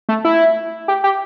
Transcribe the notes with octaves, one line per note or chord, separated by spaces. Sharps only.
A3
E4
G4
G4